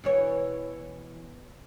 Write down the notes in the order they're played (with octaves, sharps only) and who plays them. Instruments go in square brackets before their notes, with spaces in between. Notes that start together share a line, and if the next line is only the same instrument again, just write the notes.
[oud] B2 E3 C#5